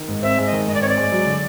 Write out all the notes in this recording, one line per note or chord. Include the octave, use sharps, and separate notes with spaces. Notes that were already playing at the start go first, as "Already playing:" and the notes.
Already playing: D#3
G#2
C4 E5
G#3
D#5
D#3
G#2 D#5
D5
C4 C#5
D5
G#3
F#3
D3